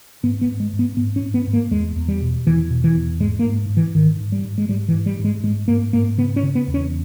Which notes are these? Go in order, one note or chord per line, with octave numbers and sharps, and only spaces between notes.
G#2 B3
B3
G#2
G#3
G#2
B3
G#2 B3
C#4
G#2
B3
G#2
A#3
E2 G#3
E2
G3
B2
E2 E3
B2
E3
E2
G#2 G#3
A#3
G#2
G#2
E3
G#2 D#3
G#2
G3
G#2
G#3
G#2 G3
E3
G#2
G3
G#2
G#3
G#2 G#3
G#2 A#3
G#2 A#3
C#3 B3
C#4
C#3
B3
E2
C#4